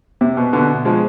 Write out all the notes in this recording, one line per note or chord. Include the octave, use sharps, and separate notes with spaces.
C3
B2
B2 D3
F3 G#3